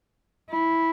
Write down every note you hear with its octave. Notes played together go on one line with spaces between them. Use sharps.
E4